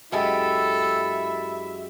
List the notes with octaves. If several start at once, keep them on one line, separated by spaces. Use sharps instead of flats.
F#2 G#3 E4 G4 A4 E5